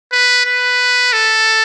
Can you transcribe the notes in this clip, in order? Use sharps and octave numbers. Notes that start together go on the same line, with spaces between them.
B4
B4
A4